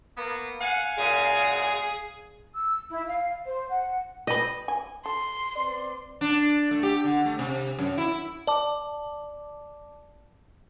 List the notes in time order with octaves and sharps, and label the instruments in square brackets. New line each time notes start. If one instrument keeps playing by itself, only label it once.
[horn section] A#3 B3
[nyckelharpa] F5 G#5 [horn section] F#5
[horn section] F#2 A#2 G#3 [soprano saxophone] G#4
[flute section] E6
E4
F5
C5
F#5
[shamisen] G4 B4 [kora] D#5
[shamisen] G#5
[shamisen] A4 [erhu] C6
[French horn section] C4 B4 D5
[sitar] D4
A3
G4
D3
A3
C3
F#2
E4
[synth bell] D5 A5 D6